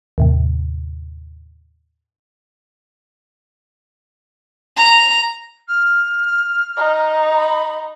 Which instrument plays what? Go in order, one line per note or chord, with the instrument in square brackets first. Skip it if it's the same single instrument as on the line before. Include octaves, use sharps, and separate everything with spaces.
[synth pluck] D#2 A2 C3
[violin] A#5
[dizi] F6
[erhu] D#4
[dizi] B5